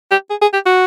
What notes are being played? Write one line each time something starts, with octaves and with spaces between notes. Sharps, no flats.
G4
G#4
G#4
G4
F#4